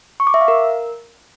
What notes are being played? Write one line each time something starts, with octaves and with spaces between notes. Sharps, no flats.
C#6
D6
E5
F5
A#4